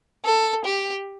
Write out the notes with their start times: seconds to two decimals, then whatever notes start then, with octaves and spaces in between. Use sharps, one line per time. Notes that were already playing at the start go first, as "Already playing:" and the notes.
0.24 A4
0.64 G4